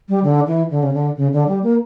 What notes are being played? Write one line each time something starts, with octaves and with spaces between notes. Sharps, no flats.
G3
D3
E3
D3
C#3
D3
C#3
D3
G3
A#3